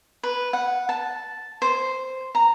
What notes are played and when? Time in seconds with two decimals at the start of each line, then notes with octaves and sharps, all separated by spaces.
0.23 B4
0.53 F#5
0.89 A5
1.62 C5
2.35 A#5